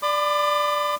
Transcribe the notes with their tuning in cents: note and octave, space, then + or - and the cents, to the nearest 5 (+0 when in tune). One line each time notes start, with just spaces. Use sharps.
D5 +0 B5 +35 D6 +35